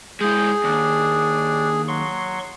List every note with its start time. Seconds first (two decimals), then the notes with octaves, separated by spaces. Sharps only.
0.21 G#3 E4 G#4 G6
0.64 D#2 D4
1.88 F#3 C6 C#6